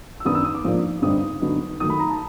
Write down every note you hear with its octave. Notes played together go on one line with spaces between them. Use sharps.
E6
F#2 D#3 F#3 B3 D4 D#6
E6
D#6
D6
G#2 F3 A#3 D4
G2 D3 G3 C4 D#4 D#6
D3 F#3 B3 D#4
D#3 F#3 A3 D#6
B5
A#5
A5